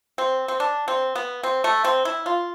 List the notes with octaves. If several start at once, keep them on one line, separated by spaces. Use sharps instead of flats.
C4
C4
D4
C4
B3
C4
A3
C4
E4
F4